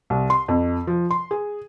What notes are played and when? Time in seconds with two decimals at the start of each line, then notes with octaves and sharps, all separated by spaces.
0.10 C2
0.30 C6
0.48 F2
0.87 F3
1.11 C6
1.31 G#4